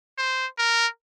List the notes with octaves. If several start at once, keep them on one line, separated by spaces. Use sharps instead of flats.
C5
A#4